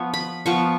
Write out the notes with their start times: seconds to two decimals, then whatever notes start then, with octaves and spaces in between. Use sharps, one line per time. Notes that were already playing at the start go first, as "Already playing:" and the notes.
Already playing: F3 B3 C#6
0.14 B5
0.46 F3 B3 C#6